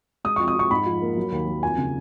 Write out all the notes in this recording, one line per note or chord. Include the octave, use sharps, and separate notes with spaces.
G#3 D#6
C#6
F2
D#6
F2 C#6
G#2 B5
F3
A#3
F#3
D#2
F#3
F2 G#5
C#3